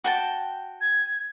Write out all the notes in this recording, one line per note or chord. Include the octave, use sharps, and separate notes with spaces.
F#4 G5 A5
G#6